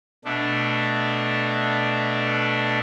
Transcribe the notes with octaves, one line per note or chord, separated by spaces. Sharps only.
B2 A3 D4